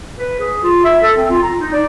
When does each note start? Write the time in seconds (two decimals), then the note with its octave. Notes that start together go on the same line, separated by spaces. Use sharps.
0.17 B4
0.39 G#4
0.63 F4
0.84 E5
1.02 A4
1.17 C4
1.30 F4
1.42 A#5
1.58 D#4
1.73 D5